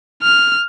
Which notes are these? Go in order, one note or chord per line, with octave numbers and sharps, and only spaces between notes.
F6